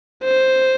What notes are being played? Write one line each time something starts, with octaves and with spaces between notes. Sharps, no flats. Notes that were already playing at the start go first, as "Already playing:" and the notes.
C5